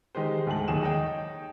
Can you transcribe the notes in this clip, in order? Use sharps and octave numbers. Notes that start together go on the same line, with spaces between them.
D#3 G#3 G4 C5
D2 G#2 G#4 G5 A5 F#7
D#2 D#3 F#3 G#4 E7
D#4 C#5 G5